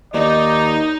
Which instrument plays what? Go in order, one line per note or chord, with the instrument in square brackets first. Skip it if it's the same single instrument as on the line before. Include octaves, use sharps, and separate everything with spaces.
[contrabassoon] D#2 [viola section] D#4 [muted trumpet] D5 [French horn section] D#5